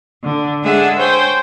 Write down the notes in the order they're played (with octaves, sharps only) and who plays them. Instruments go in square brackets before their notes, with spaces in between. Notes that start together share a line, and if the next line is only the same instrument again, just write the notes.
[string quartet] D3
G#3 D4 G#4 A4 E5 F#5
C5 C#5 G5 G#5